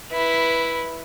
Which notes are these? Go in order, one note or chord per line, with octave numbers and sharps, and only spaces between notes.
E4 B4